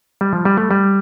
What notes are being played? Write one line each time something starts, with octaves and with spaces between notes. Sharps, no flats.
G3
F3
G3
A3
G3